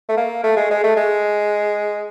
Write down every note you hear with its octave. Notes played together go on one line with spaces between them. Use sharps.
A3
A#3
A3
G#3
G#3
A3
G#3